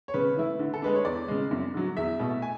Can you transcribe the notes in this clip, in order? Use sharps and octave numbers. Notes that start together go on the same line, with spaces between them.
C#5
C#3 B4
E3 A3 E4
D3
A4
G#3 D4 B4
C#5
E2 D5
C#3 G#3
F#2
D3 F#3
E2 E5
B2 A3
G#5